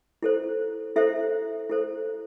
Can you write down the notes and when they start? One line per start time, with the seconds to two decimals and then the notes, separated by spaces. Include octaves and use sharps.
0.22 E4 A4 C5
0.96 E4 A4 C5 E5
1.69 E4 A4 C5